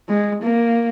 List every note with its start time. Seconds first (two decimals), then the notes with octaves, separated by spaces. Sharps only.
0.09 G#3
0.43 A#3